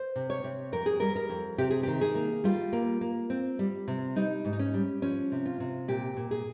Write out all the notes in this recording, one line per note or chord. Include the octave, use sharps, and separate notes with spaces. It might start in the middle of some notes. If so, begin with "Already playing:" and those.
Already playing: C5
C3
C#5
C3
F2 A#4
G#4
G3 A#4
A#4
F2
C3 G4
G#4
D#3 G4
G#4
A#3
G3 F4
A#3
A#3
C4
G3
C3
G3 D#4
G#2
D#4
C#4
G3
F3 C#4
C3
F4
C3
A#2 G4
A#2
G#4